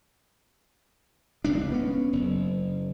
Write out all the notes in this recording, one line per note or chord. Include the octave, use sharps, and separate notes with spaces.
F1 C#2 A#2 D4
B3 C#4
F#1